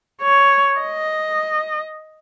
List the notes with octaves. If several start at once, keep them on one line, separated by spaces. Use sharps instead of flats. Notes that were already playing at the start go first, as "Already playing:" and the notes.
C#5
D#5